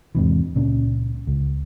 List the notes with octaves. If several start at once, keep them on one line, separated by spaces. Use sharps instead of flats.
E2 G#2 C3 E3
C#2 A#2 C#4
C#2